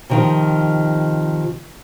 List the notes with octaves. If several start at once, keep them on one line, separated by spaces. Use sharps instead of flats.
C3 D#3 F3